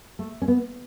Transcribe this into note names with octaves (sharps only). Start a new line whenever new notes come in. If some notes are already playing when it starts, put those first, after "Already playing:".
A3
C#4
B3